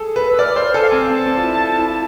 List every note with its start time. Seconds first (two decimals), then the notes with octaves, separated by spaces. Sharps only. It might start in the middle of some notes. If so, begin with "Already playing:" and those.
Already playing: G#4 A4
0.16 B4
0.29 E6
0.39 D5 F6
0.56 C5
0.74 A4 G#5
0.82 F5
0.90 C4 G#5
1.08 C4 A5
1.26 C4
1.37 F4
1.43 E4
1.61 F4
1.78 E4